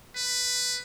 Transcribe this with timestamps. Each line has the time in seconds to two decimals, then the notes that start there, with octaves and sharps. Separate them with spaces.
0.17 B4